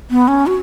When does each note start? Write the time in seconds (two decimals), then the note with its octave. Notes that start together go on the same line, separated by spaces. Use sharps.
0.11 B3
0.28 C#4
0.47 F#4